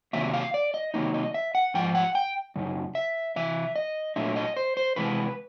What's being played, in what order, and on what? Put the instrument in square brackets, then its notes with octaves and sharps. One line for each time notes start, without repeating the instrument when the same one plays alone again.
[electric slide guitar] C3 D#3 F#3 A#3 E5
F5
D5
D#5
C3 D#3 F#3 A#3 D#4 D#5
D#5
E5
F#5
G#2 F3 G5
F#5
G5
F#2 C#3 D#4
E5
C3 E3 E5
D#5
A#2 F#3 A3 D4 E5
D#5
C5
C5
C3 E3 G#3 B4